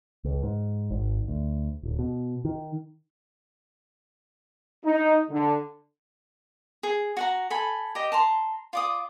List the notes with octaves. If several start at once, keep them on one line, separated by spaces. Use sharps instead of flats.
C#2
G#2
G#1
D2
D1
B2
D#3
D#4
D3
G#4
F#4 F#5 A#5
A4 G#5 B5
G4 D#5
A5 A#5 C6
F4 D5 D#6